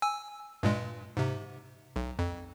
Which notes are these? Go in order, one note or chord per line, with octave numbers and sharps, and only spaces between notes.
G#5 E6
G2 A#2 G#3
G#2 C3
B1
F2